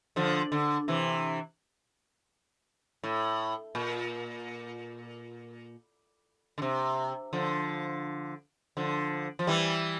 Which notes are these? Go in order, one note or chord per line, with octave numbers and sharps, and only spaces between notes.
D3 F3
D3
C3 E3
A2
A#2
D3
C3
D3 F3
D3 F3
F3
E3 G3